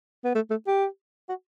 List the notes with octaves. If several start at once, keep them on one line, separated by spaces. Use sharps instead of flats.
B3
A3
A3
G4
F#4